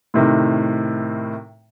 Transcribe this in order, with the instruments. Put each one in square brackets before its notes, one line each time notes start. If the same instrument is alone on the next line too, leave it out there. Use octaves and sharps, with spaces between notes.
[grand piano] A2 C3 D#3